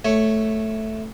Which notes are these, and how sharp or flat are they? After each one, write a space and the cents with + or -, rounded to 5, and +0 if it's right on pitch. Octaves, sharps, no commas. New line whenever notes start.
A3 +0 C#5 +0